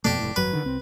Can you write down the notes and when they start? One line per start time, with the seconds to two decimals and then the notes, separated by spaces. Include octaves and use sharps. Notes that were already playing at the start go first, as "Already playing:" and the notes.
0.05 F2 B2 A3 D4 G4
0.19 F1 A2
0.36 G#1 F#2 F#3 B4
0.53 D3 D#3
0.64 C2 C4